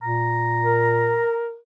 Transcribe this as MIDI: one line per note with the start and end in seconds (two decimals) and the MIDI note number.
0.03 1.23 46
0.03 1.36 82
0.63 1.57 70